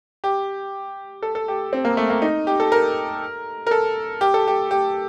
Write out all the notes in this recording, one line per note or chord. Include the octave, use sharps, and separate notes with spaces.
G4
A4
A4
G4
C4
A#3
A3
A#3
D#4
G4
A4
A#4
A#4
A4
G4
A4
G4
G4